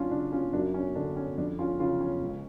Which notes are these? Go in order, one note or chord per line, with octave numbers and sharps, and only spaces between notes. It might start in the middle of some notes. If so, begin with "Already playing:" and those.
Already playing: F#2 C#4 D4 F4
C#3 D4
C#4 F4
F#2 D4
C#4
D3 D4
C#4
F2 D4
C#4 F4
C#3 C#4 F4
C#4
C#2